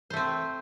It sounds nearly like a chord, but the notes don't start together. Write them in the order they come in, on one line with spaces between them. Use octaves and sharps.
C5 A3 C4